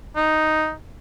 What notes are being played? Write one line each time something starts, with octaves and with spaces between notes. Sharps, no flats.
D#4